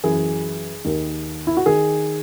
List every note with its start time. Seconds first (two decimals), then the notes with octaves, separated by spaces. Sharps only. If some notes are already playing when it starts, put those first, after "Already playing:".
0.04 F#2 E3 G#4
0.84 D#2 D#3
1.47 E4
1.57 F#4
1.66 D#3 G#4